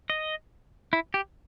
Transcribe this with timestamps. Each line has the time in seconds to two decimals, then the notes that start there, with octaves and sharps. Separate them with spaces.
0.10 D#5
0.93 E4
1.14 G4